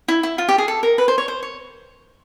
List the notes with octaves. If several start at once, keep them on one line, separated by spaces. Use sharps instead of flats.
E4
E4
F4
G4
G#4
A4
A#4
B4
C5
C#5
C5
C#5